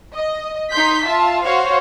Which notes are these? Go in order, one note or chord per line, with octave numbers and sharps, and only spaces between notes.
D#5
D#4 C6 G6 B6
F4 E5 A5
F#4 C5 C#5 F5